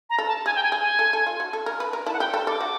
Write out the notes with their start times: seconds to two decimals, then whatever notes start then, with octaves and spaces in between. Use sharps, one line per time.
0.10 A#5
0.18 A4
0.28 A5
0.46 G#4 G#5
0.56 G5
0.63 G#5
0.72 G#4
0.81 G#5
0.99 A4
1.13 A4
1.26 F4
1.40 F#4
1.53 A4
1.66 A#4
1.80 B4
1.93 A#4
2.06 E4 A5
2.13 F#5
2.20 G4 G5
2.33 A4 A5
2.47 A4 D6
2.61 F#4